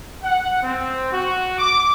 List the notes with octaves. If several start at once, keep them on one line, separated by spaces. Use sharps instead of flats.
F#5
C4
F#4
D6